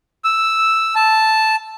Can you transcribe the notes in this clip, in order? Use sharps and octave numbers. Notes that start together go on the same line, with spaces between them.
E6
A5